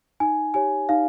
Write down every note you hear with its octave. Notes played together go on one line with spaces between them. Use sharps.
D#4 G#5
G4 C#5 G#5
D#4 F5